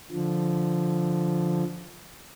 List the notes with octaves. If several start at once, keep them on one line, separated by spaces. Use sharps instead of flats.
D3 F3